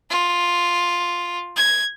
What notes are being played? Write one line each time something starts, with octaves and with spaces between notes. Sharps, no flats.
F4
G#6